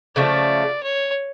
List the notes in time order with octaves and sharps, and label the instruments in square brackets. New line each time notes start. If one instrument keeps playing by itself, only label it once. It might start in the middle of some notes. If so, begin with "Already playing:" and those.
[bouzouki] C#3 F3 A3 [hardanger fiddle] D5
[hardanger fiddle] C#5